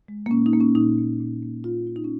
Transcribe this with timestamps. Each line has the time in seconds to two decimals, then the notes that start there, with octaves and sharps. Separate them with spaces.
0.08 G#3
0.26 A#3
0.30 A#2 C#4
0.46 D#4
0.53 A#3
0.60 C#4
0.75 A#2 D#4
0.98 A#3
1.20 A#2
1.43 A#3
1.64 A#2 F4
1.86 A#3 F4
1.96 D#4
2.04 C#4